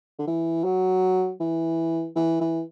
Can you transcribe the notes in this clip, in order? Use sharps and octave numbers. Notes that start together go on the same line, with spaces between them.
D3
E3
F#3
E3
E3
E3